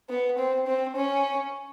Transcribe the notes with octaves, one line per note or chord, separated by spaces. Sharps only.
B3
C4
C4
C#4